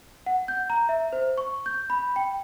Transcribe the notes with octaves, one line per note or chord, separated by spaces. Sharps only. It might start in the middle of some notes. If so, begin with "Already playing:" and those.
F#5
G6
A#5
E5
C5
C#6
G6
B5
G5